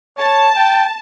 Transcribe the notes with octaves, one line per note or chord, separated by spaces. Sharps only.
C#5 A5
G5